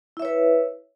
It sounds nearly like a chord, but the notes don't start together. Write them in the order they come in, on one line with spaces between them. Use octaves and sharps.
E4 E5 C#5 B4